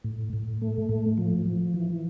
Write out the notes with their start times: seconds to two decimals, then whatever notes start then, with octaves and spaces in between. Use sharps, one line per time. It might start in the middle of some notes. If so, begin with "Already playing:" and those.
0.04 A2
0.33 A2
0.62 A3
0.89 A2
1.18 F3
1.46 F3
1.74 E3